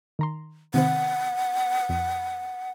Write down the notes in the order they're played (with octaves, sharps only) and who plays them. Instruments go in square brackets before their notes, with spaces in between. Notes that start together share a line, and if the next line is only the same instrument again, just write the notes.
[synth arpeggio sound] D#3 A#5 C6
[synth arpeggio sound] C3 D#3 C4 [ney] F#5
[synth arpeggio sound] F2